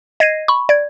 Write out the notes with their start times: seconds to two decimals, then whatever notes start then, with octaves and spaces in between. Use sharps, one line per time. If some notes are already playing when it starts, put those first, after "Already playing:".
0.20 D#5 G#6 A#6 C7 D#7
0.48 B5 C#6
0.69 D5 G#6